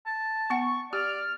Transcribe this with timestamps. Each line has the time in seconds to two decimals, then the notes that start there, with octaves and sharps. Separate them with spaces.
0.06 A5
0.50 B3 F#5 C#6
0.93 G4 D5 F6